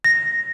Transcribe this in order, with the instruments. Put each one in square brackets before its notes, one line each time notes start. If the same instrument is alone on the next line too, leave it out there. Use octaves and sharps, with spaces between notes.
[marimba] A#6